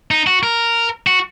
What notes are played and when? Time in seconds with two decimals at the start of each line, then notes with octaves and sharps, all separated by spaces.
0.11 D#4
0.27 F#4
0.43 A#4
1.07 F#4